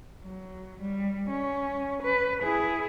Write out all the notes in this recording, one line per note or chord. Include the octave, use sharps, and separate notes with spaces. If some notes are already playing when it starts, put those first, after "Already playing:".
F#3
G3
C#4
B4
E4 G#4